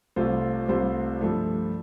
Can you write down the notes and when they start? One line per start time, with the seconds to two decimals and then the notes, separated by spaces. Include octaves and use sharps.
0.16 C2 C3 A3 F4 C5
0.69 C2 C3 A3 F4 C5
1.21 G2 F3 A3